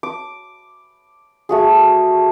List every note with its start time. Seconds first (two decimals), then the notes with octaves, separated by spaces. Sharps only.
0.03 D6
1.49 A3 F#4 G#4